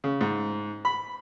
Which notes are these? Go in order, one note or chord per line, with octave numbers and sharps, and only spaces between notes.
C#3
G#2
B5